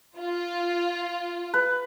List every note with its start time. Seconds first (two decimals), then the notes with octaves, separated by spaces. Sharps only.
0.18 F4
1.54 B4